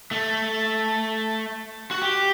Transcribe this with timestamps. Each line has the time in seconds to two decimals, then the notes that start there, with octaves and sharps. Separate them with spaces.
0.11 A3
1.91 F#4
2.02 G4